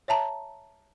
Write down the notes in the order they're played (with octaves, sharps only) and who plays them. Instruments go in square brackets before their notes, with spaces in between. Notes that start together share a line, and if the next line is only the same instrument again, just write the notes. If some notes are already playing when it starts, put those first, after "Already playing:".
[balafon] C#5 E5 A5 A#5